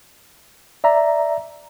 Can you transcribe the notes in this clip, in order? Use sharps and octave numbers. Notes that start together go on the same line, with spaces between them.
D5 E5 A#5